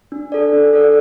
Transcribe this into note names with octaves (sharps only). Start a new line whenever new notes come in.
D4
A4 D5
D4
A4 D5